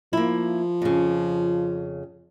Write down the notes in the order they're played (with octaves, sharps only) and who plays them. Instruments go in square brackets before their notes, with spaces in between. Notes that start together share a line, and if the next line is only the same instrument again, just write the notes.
[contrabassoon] F3 [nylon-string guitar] A#3 E4
[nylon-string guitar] F2 C#3